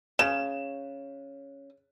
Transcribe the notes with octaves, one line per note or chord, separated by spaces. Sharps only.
C#3 E7